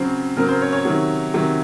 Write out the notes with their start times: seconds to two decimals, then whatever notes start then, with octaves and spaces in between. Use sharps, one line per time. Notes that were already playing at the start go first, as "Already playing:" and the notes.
Already playing: C#3 F#3 C4
0.36 C#3 F#3 C4 A#4
0.48 C5
0.62 C#5
0.72 C#5
0.85 C3 D#3 F#3
1.34 C3 D#3 F#3